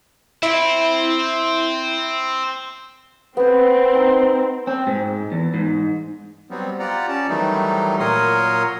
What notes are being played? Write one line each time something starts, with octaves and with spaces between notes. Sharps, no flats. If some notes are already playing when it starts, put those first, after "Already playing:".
C4 E4
B3 C4 C5
D#4
C4
G#2
E2
G#2
F#3 G3 B3 C4
F4 G4 D5 F#5 A#5
C#4 D5 A5
D#3 E3 F#3 G3 A3 D#4
A#2 F#3 A#4 C#5 C6 D#6